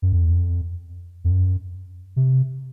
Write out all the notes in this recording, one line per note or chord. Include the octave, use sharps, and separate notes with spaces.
F#2
F2
E2
F2
F2
F#2
C3